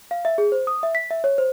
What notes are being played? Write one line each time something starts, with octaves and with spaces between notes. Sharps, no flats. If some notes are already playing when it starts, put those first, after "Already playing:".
F5
E5
G#4
C5
D#6
E5
B6
E5
C#5
C5